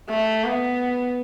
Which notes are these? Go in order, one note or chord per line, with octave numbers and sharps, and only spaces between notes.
A3
B3